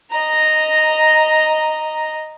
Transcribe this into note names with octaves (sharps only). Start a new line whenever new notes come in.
D#5 A#5